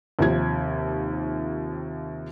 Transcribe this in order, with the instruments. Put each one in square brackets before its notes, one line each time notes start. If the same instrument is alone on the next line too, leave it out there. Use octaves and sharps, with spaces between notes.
[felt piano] D#2 C3 D#3 F3 G#6